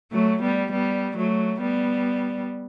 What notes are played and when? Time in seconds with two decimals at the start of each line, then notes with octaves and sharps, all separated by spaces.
0.12 F#3 A3
0.42 G3 B3
0.72 G3 B3
1.17 F#3 A3
1.61 G3 B3